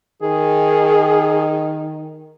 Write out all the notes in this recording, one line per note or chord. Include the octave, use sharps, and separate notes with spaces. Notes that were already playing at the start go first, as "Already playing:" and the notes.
D#3 G#4